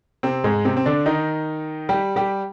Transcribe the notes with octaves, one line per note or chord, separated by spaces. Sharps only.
C3 C4
G#2 G#3
C3 C4
C4
D3 D4
D#3 D#4
G3 G4
G3 G4